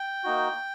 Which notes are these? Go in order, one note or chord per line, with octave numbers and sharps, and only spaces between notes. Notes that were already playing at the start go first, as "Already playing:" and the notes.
Already playing: G5
A#3 D#4 F#4